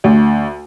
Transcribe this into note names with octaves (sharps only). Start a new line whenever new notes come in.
D2